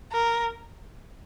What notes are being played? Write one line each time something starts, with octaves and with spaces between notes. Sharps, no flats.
A#4